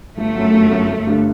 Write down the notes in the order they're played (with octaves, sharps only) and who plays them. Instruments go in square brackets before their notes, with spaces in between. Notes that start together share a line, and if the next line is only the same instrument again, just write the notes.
[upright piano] G1 [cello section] A3
[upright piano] F#2 F#3
G1
F#2 F#3
G1
G2 D3